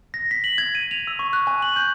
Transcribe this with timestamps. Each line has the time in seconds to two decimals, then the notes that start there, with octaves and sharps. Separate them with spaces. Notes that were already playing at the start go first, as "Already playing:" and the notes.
0.14 A#6
0.31 B6
0.44 F#7
0.58 G#6
0.75 D#7
0.91 F7
1.07 E6
1.19 C#6
1.33 F#6
1.47 G#5
1.62 F#7
1.76 G6